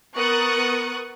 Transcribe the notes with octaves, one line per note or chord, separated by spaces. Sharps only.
B3 A#4 C#6 D#6 F#6 A6